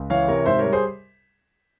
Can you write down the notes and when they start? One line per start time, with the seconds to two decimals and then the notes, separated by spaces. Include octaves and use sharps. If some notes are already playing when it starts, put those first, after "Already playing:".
Already playing: C#2
0.10 E3 C#5 F5
0.28 C3 A#4 C#5
0.46 G#2 C5 E5
0.59 G3 A#4 C#5
0.72 G#4 C5